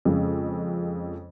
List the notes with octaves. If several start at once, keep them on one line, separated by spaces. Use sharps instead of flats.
F2 C#3 G#3